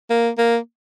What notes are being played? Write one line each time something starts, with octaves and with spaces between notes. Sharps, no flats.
A#3
A#3